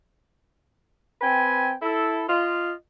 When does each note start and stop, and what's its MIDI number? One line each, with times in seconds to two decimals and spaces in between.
1.21 1.73 60
1.21 1.73 71
1.21 1.73 79
1.21 1.73 80
1.82 2.24 64
1.82 2.24 69
2.28 2.72 65
2.28 2.72 75